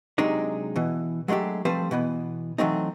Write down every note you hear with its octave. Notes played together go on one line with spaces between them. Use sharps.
C3 F#3 G#3 D4 D#4
B2 E3
F#3 G#3 A3 D4 G4
F3 G3 A3 C4 B4 C5
B2 E3 B3
E3 F#3 A3 C4 D#4